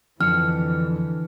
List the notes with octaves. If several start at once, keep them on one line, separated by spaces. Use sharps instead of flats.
F2 D3 E3 F6 C#7